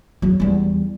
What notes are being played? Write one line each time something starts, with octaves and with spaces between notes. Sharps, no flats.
E2 F#3
E2 G3